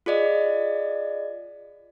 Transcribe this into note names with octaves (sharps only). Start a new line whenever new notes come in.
F4 G#4 D5 D#5